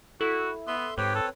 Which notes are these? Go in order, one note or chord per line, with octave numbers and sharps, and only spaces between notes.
E4 F#4 A4
B3 E5 C6
G#2 C4 G4 B4 C#5
A4